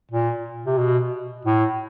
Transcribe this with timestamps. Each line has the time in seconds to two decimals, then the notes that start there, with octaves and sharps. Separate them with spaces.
0.11 A#2
0.66 C3
0.78 B2
1.45 A2